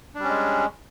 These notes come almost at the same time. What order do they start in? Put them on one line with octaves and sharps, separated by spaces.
D4 G3 C#4 G#3